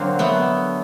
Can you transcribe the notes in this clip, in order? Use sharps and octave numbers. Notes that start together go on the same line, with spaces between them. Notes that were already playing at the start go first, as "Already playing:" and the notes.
Already playing: D3 F#3 A#3 C4
A3 B3